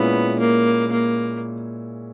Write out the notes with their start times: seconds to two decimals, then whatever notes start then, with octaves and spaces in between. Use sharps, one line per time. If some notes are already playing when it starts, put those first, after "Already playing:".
Already playing: A#2 G#3 B3 C#4 E4
0.39 A#3
0.92 A#3